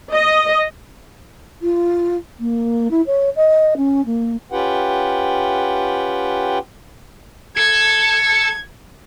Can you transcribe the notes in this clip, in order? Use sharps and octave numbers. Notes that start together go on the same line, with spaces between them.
D#5
F4
A#3
E4
C#5
D#5
C#4
A#3
C#4 F4 G4 B4 F#5 G5
A4 G#6